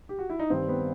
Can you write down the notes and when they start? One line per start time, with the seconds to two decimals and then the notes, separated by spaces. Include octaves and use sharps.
0.09 G4
0.19 F#4
0.30 E4
0.39 D#4
0.50 G2 D#3 G3 C4
0.69 B3